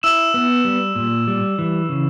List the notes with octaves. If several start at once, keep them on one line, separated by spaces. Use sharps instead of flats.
E4 E6 E7
B3
G3
A#2
G3
E3
C#3